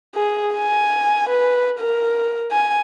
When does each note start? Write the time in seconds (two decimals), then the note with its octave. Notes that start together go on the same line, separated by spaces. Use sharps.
0.16 G#4
0.55 G#5
1.29 B4
1.80 A#4
2.52 G#5